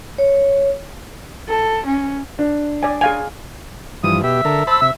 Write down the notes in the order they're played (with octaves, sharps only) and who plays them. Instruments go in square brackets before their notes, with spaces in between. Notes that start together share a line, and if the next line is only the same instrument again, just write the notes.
[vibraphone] C#5
[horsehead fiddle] A4
C#4
[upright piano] D4
[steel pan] D5 G#5
G#4 F5 G#5
[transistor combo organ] G2 E3 F3 [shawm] D#6
[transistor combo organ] B2 G4 [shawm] E5
[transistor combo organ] D3 A4 A#4
[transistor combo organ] C5 A5 B5 [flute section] E6
[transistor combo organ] C3 [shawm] E5